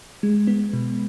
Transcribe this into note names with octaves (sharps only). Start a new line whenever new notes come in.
G#3
B3
B2